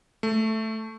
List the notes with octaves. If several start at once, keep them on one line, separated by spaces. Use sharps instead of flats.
A3